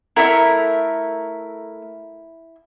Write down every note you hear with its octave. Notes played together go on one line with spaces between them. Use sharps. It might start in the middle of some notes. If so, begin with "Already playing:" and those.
A3 E4 A#4 E5